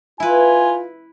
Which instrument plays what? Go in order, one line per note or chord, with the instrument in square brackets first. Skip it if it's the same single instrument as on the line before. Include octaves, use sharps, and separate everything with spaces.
[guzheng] E4 B4 [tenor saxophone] F4 [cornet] G#5